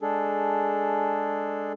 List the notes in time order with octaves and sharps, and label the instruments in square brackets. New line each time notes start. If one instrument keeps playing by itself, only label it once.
[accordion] G#3 D4 G#4 A4